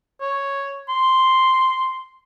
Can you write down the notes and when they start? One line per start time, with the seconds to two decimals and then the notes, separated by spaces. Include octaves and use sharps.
0.21 C#5
0.89 C6